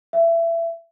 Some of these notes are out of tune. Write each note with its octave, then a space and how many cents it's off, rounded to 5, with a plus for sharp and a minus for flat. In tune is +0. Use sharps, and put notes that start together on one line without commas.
E5 +25